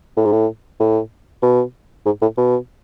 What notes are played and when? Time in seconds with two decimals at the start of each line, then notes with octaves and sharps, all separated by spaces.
0.17 A2
0.25 G#2
0.32 A2
0.80 A2
1.43 B2
2.05 G#2
2.22 A2
2.37 B2